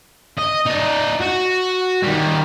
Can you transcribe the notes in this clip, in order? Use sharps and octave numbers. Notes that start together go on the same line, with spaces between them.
D#5
D#4 D5
F#4
D#3 G3